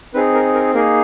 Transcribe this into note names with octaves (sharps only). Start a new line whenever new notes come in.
C4 D#4 G#4 B4
A#4
A#4
A#3 D#4 G#4 A#4